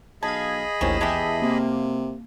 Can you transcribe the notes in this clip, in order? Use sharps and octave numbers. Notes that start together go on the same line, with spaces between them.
B1 G#4 D#5 F5 A5 B5 G#6
A1 D#2 A2 D#3 F3 C#4 E7
E2 G#3 E4 G4 E5 A5
C3 A#3